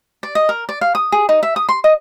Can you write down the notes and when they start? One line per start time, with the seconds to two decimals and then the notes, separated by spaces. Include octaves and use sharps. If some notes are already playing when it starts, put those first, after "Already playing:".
0.23 D5
0.35 D#5
0.49 A#4
0.69 D5
0.81 F5
0.95 D#6
1.12 G#4
1.29 D#4
1.43 E5
1.56 D#6
1.69 C6
1.84 D#5